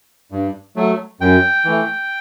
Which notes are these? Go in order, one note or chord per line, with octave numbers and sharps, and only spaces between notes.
G2
F#3 A3
F#2 G5
E3 A3